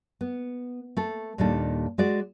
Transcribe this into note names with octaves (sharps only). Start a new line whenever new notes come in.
B3
A3 A4
D#2 A#2 G3 D4 D#4 A4
G#3 F#4 D5